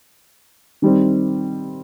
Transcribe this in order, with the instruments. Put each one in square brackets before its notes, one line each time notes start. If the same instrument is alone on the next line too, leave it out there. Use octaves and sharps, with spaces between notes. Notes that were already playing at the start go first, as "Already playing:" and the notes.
[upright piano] D#3 G3 C4